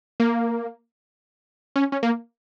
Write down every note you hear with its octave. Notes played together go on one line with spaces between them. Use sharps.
A#3
C#4
C#4
A#3